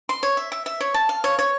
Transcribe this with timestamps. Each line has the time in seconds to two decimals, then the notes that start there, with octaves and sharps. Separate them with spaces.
0.09 C6
0.23 C#5
0.37 E5
0.52 E5
0.66 E5
0.81 C#5
0.94 A5
1.09 F5
1.24 C#5
1.39 C#5